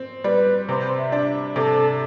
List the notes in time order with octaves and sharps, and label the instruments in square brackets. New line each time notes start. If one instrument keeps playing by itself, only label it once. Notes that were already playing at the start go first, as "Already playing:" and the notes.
Already playing: [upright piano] C4
[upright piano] G3 [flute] B4
[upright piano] C3 [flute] C5
[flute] E5
[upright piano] D4
[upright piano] C3 [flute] A4